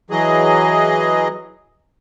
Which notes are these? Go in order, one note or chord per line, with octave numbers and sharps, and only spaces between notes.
E3 F#3 G#4 D#5